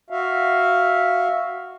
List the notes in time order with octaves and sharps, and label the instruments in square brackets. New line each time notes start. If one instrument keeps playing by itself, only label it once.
[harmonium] F#4 E5 F5